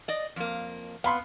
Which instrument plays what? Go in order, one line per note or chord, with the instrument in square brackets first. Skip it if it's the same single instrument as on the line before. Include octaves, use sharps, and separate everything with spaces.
[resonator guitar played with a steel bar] D5 D#5
F2 A#3
[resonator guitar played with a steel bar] B3 [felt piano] F5 B5 C6